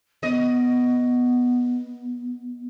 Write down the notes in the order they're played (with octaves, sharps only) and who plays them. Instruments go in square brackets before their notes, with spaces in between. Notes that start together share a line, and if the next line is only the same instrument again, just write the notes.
[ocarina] B3 [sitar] D#5